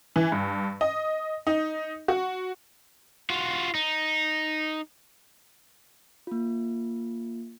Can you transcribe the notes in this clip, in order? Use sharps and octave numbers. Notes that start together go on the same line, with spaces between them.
E3
G2
D#5
D#4
F#4
F4 F#4
D#4
A#3 F4